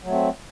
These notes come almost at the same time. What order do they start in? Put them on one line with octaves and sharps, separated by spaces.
F#3 A3 C4